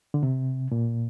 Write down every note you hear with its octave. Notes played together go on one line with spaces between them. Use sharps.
D3
C3
A#2